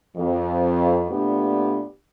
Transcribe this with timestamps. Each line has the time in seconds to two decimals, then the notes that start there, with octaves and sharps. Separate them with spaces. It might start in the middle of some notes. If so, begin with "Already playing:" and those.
0.17 F2
1.11 A#2 A3 B3 D4 G4